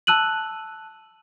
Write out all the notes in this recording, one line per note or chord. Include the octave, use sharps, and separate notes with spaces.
A5 E6 F#6 D#7 F#7